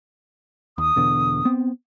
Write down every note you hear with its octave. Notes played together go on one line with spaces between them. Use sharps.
D#2 D#6
E2 B2 D3
B3 C4